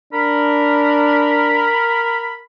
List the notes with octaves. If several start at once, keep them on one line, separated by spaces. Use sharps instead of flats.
D4 A#4 B5